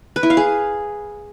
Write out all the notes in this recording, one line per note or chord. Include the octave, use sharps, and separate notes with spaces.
B4
E4
F5
G#4